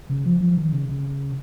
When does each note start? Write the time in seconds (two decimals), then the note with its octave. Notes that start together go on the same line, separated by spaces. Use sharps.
0.10 C#3
0.26 F3
0.41 F3
0.57 D#3
0.73 C#3
0.89 C#3